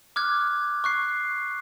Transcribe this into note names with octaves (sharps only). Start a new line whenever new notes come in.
D6 F6 F#6 G#6
C#6 F#6 C7